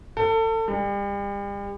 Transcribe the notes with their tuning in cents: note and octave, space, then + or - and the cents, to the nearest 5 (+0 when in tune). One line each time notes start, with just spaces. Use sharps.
A4 +30
G3 +40